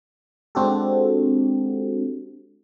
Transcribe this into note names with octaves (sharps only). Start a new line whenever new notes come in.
G#3 C4 D4 F#4 G4 A4